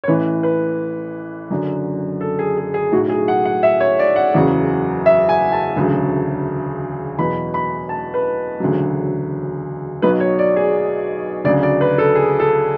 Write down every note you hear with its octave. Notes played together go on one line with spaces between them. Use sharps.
C#5
A1 A2 E3 B4
B4
F#1 F#2 D3 F#3
A4
G#4
G#4
G#4
B1 A2 F#3 F#4
G#4
F#5
F#5
E5
C#5
D5
F#5
F#1 E2 C#3 F#3
E5
G#5
A5
E1 D2 C#3 F#3
E2 B2 F#3 B5
B5
A5
B4
E1 D2 C#3 F#3
B1 B2 F#3 B4
C#5
D5
G#4
D2 C#3 F#3 D5
D5
B4
A4
G#4
A4